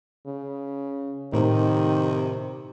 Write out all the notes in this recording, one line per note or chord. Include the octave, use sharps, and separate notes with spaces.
C#3
A2 C3 D#3